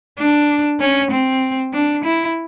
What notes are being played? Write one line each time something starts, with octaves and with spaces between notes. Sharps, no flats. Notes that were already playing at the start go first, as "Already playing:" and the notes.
D4
C#4
C4
D4
E4